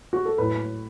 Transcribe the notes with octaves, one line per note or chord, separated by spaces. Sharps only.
F#4
A4
A2 F#3 B4